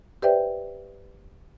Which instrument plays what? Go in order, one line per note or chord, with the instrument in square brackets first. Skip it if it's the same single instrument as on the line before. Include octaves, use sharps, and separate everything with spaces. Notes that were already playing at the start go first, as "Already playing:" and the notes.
[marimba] G4 B4 C5 D5 E5 G5